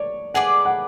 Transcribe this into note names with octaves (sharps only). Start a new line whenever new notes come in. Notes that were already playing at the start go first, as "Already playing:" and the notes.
Already playing: C#5 D5
G#4 B4 D5 F#5
F#5